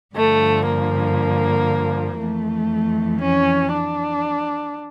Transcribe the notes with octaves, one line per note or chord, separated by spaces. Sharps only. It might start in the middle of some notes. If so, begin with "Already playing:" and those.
G2 D3 F3 A3
A#3
F2 E3 A3
C#4
D4